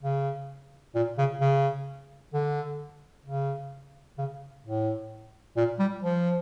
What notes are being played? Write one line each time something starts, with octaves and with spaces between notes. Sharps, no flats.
C#3
A#2
C#3
C#3
D3
C#3
C#3
A2
A#2
G3
F3